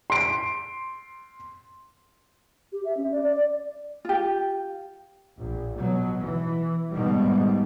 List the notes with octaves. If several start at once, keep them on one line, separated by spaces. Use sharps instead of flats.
C6 D7
G4
E5
C#4
D5
D5
F4 G4
A#1
B2 F#3
E3
G#2 B2 D#3 G3